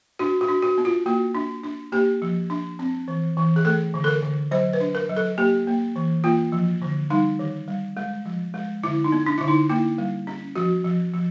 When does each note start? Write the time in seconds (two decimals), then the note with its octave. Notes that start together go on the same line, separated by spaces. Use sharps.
0.19 D4 F#4
0.41 F#4
0.48 D4
0.62 F#4
0.78 B3
0.85 F4
1.06 A#3 F#4
1.35 D4
1.63 D4
1.92 A#3 G4
2.22 F3
2.50 D4
2.79 C4
3.08 E3
3.37 E3
3.56 G#4
3.65 A3 A4
3.94 D3
4.04 A4
4.08 A#4
4.23 D3
4.51 F#3 C5
4.73 B4
4.81 D4
4.95 A#4
5.09 F#3
5.16 A4
5.38 A#3 G4
5.67 A#3
5.96 E3
6.24 A#3 F4
6.52 F3
6.82 D3
7.10 G3 D#4
7.39 D#3
7.68 G3
7.97 G#3
8.26 F3
8.54 G#3
8.83 D3 E4
9.04 D#4
9.12 B3
9.26 D4
9.38 D3 E4
9.48 D#4
9.70 A#3 E4
9.98 G3
10.27 C#4
10.56 F3 F#4
10.84 F3
11.14 F3